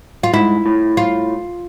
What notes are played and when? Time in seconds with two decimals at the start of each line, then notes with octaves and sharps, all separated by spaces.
0.23 F4
0.33 G#2 E4
0.66 A2
0.97 F4